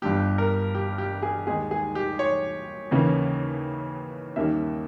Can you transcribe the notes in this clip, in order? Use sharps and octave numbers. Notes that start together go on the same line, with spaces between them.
G1 G2 G3 G4
A#4
G4
G4
G#4
D#2 D#3 G#3 G#4
G#4
G4
C#5
D#2 C#3 E3 A#3 C#4
D#2 D#3 G3 A#3 C#4 E5